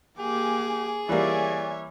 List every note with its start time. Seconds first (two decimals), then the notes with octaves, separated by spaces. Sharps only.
0.19 A#3 G4 G#4 G#5 D6
1.09 E3 G3 A#3 C#5 D5 E5 G#5